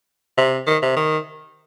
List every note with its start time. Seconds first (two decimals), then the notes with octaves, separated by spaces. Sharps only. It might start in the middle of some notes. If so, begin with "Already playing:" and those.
0.38 C3
0.67 D#3
0.82 C3
0.97 D#3